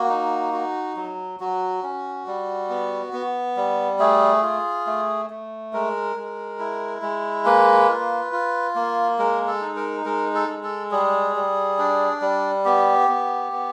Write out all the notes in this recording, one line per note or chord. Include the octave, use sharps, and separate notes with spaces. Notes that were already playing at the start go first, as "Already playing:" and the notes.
Already playing: A#3 F#4
D#4
F#4
F#3
F#3 F#4
C#4
G3
B3
B3
G3
A3 G#4
F4
A3
A3
G#3 A#4
G#3
E4
G#3
A#3 B4
F4
F4
A#3
G#3 A#4
A4
D#4
A#4
G#3 A#4
A4
G#3
A4
G3 G#4
G3
D4
G3
B3 G4
B3
B3